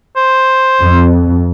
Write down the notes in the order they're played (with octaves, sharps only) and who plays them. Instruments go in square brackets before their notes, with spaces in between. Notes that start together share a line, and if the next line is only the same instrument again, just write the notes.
[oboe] C5
[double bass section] F2